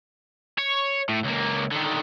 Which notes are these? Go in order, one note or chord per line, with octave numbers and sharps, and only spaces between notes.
C#5
A2
C#2 A#3
D3 D#3